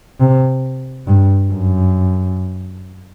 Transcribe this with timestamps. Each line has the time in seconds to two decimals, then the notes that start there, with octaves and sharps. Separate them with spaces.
0.20 C3
1.07 G2
1.52 F#2